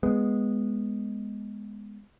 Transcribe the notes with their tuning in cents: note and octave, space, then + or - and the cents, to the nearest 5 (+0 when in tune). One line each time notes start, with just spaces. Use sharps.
G#3 +0 B3 +0